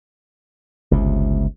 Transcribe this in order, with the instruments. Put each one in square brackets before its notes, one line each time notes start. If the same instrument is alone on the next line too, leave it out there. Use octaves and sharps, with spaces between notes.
[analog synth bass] G1 [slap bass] C#2 C3